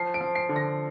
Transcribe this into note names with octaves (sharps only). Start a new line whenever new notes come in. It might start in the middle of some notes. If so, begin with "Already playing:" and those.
Already playing: F3 C7
D7
F3
C7
D3
A#6